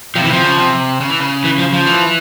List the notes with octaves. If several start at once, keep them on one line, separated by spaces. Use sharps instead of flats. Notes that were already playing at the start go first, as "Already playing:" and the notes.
C3 F3
E3
C3 F3
C#3
C3
C#3
E3
C#3
E3
F3
F3
E3